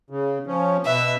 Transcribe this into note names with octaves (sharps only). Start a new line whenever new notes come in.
C#3
F3 C#4
B2 B4 E5